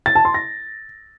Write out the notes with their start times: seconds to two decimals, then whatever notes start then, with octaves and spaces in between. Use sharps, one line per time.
0.06 A6
0.15 A5
0.25 C6
0.34 A#6